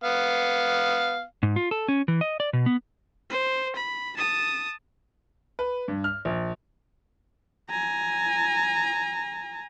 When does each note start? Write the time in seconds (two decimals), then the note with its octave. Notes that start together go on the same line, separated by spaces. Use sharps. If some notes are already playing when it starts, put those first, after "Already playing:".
0.04 B3 F5
1.43 G#2
1.56 F4
1.71 A4
1.88 C#4
2.08 E3
2.21 D#5
2.40 D5
2.53 B2
2.66 B3
3.30 C5
3.76 B5
4.16 A5 D#6
5.59 B4
5.88 G2
6.04 F6
6.25 A#1
7.70 G#5 A#5